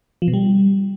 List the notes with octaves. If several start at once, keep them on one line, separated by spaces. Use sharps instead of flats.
F3
B2
G3